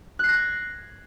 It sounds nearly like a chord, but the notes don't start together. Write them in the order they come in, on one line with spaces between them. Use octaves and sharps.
F#6 C7 A#6 G#6